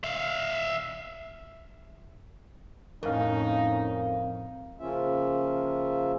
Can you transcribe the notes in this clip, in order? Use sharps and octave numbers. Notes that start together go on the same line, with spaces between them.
E5 F5
F2 A2 C#4 D#4 A#4 F5
C#3 F3 A#3 C#4 F4 E5